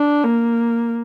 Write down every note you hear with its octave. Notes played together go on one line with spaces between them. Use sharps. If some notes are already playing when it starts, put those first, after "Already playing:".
Already playing: D4
A#3